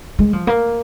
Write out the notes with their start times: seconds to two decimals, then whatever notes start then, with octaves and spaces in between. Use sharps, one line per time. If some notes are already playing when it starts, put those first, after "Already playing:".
0.19 G#3
0.33 F3
0.47 A#3